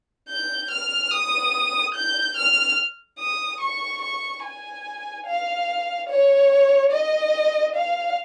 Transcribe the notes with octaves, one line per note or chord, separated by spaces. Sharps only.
G6
F6
D#6
G6
F6
D#6
C#6
C#6
G#5
F5
C#5
D#5
F5